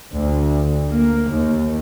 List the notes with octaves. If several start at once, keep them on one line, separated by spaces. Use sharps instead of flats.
D2
A#3
D#2